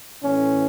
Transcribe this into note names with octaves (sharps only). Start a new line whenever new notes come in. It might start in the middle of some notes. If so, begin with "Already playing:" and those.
A2 E3 A3 C#4